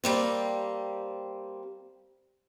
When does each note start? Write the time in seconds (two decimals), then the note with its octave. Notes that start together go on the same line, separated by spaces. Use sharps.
0.04 G3 A#3 C4